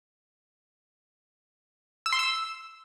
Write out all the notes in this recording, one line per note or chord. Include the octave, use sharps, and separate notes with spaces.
E6
C6
E6